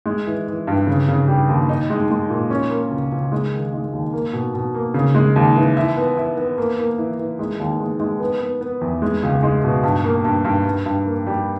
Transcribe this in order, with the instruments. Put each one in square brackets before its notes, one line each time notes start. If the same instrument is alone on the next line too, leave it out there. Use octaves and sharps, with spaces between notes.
[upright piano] G#3
E3
E3
G2
C#3
C#3
G3
D#2
D#4
G#3
G#3
A#2
C#4
A#3
C#2
C#2
G#3
D#3
G#3
D#2
A#3
B2
B2
A#3
C#3
G#3
D#2
E3
E4
B3
E4
B3
A#3
A#3
E3
E3
G#3
D#2
G#3
G#3
B3
B3
B3
E2
G#3
C#2
G#3
B2
G2
A#3
G2
G2
G2
G2
A#3
G3